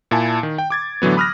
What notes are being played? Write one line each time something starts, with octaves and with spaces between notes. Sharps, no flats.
A#2 E4 G#5 A5
D#3
G5
D6 G#6 A6
A2 D3 E3 F#3 B3
B5 D#6 F6 F#6 A#6